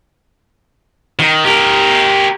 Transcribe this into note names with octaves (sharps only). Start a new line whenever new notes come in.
D#3
G4 A#4